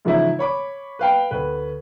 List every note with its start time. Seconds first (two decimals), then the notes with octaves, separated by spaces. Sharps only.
0.05 G#2 C#3 E3 F3 D#4 E4
0.39 C#5 B5 D6
0.99 B4 F5 G5
1.31 D2 B4